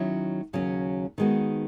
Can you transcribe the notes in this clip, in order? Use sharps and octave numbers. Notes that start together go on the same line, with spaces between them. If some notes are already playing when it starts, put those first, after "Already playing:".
Already playing: D#3 F#3 C#4 E4
D#2 C#3 F#3 C#4 F#4
D#3 G#3 B3 F#4